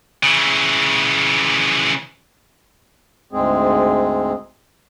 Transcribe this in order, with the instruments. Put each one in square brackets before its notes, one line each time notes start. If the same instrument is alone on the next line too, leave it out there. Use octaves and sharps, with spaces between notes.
[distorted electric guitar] C#3 E3
[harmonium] D2 G#2 G#3 C4 G#4